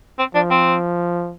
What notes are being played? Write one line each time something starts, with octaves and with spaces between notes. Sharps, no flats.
C4
F3 D4
C4